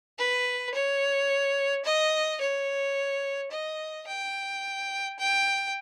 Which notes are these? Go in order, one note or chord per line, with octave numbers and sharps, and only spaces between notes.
B4
C#5
D#5
C#5
D#5
G5
G5